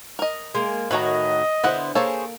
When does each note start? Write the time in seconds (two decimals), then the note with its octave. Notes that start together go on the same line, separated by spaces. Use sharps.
0.19 A#4 D#5
0.55 G#3 A#3
0.91 A2 D#3 F#4 B4 C#5 D#5 A#5
1.64 D3 B3 E4 C5 F#5
1.95 A#3 G#4 A4 C5 C#5